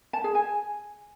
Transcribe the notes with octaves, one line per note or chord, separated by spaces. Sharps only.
A5
G#4
G#5